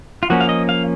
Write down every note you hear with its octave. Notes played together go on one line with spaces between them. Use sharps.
F4
F3 A#3 C#4 F#4
F5
D#5
F5